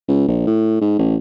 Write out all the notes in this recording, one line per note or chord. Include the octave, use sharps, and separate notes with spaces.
C#2
A#1
A2
G#2
A1